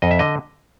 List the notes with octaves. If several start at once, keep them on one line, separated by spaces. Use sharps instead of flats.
F2 D#5
E5
D3 D#5